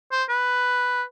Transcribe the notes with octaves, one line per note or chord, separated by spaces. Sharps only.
C5
B4